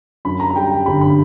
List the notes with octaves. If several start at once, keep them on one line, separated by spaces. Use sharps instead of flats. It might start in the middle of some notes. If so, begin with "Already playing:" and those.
F#2 B5
A#5
A#5
G3 G5
G5
G1 B5
B5